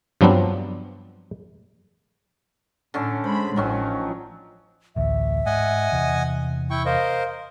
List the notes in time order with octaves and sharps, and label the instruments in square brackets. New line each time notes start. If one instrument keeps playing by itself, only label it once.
[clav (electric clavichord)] G2 F3 F#3 B3 C4 D4
[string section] A2 [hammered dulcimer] D3 C#4 A4
[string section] G#3 B5 [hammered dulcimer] C5
[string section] A1 F3 [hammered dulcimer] D#3 F#3 C#4
[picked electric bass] A1 D2 [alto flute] E5
[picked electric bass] G#2 [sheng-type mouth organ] D#5 F#5 G#5
[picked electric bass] E2 C3 E3
[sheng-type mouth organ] E4 G5 C#6
[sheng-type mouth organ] A#4 C5 D#5 [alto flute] F5